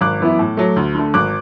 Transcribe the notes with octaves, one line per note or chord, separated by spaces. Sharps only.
G#1 D6 F#6
F#2 E3 B3 E4
A2
F#3 A3
D2
D3 A3
G#1 D6 F#6